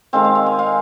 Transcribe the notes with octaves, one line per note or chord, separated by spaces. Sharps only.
D#3 G#3 C4 F5
F5
F5
G#5
F5